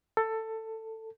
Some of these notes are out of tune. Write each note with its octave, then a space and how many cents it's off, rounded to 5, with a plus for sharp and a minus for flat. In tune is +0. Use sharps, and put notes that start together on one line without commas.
A4 +15